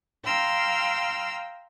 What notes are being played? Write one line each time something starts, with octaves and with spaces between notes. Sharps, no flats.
F5 G5 A#5 C6 E6 F6